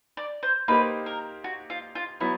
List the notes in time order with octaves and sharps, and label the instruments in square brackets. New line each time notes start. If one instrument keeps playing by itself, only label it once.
[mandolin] D5
C5
[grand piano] A#3 D#4 G4 C5 [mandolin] B4
[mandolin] A#4
F#4
F4
F4
[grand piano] F#3 B3 [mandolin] E4